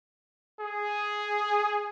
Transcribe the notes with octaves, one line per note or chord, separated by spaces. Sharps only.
G#4